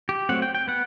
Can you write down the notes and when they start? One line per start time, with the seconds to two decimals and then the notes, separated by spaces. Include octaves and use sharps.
0.09 G4
0.29 F#3 A3 C4 F#5
0.42 G5
0.55 G5
0.68 B3 F#5